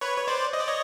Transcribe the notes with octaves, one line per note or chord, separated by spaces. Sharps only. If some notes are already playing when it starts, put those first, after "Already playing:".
B4 C#5
C#5
C5 D5
D#5
D5
C#5 D#5